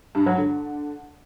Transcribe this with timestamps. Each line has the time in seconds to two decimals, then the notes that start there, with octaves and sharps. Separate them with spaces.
0.15 G2
0.26 F#3
0.38 D3